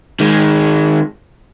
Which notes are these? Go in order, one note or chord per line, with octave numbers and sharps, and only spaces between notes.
D#3 G#3